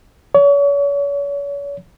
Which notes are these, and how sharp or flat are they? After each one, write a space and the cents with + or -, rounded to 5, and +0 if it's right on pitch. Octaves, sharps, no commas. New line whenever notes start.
C#5 +40